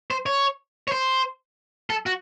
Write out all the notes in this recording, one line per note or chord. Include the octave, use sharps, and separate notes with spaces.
C5
C#5
C#5
C5
A4
F#4